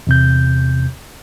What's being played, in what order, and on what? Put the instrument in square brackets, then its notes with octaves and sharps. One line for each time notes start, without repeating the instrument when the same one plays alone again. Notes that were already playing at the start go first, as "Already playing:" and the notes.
[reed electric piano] E2 C3 G6